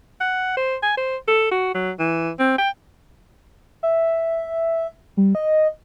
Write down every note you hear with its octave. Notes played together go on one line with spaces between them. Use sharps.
F#5
C5
G#5
C5
A4
F#4
F#3
E3
C4
G5
E5
G3
D#5